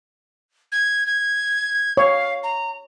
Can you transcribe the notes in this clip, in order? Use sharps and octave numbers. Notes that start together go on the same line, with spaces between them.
G#6
G#6
C#5 F5
A#5